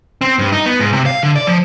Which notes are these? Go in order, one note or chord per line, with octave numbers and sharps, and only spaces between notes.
C4
G2
D#4
B3
G#2
C3
F5
D3
D5
F3